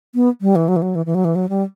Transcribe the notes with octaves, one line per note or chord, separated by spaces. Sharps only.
B3
G3
E3
F#3
E3
F#3
E3
E3
F#3
E3
F#3
G3